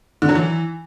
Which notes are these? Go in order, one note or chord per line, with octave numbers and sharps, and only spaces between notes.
D3
F#3
E3